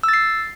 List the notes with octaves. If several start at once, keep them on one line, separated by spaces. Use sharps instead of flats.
E6
A6
C7